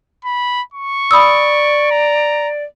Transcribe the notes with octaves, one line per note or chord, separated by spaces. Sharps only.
B5
C#6
D5 B5 D#6 E6
A#5